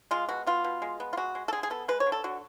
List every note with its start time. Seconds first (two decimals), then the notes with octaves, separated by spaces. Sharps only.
0.11 G#3 F4
0.29 B2 F#4
0.47 B3 F4
0.64 B2
0.82 G#3
1.00 B3
1.13 F4
1.17 G#3 F#4
1.35 G#3
1.48 A4
1.53 D3 G#4
1.63 G#4
1.70 B3 A4
1.88 G#3 B4
2.00 C#5
2.07 D3
2.12 A4
2.24 D3 F#4